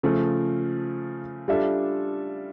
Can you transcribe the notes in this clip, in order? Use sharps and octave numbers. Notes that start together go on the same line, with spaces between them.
C#3 F3 A3
G3 D4 F4 A4 E5